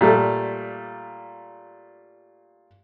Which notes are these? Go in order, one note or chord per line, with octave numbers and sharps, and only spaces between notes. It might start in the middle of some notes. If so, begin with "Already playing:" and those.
A#2 G3 A3